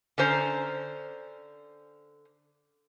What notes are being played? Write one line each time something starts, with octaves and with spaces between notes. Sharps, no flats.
D3 C#4 C5 A#5